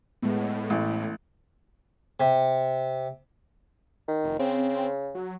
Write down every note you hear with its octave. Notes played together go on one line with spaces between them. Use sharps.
A2 G#3 B3
A1
C3
D#3
F1
C#3 C4
F#3